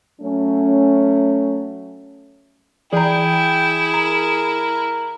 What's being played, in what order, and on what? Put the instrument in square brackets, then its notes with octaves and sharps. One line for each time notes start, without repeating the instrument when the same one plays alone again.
[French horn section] F#3 A3 C#4
[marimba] E3 A#5 [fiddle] E4 [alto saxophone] G#4 [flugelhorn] G5
[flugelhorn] A#4 [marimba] A#5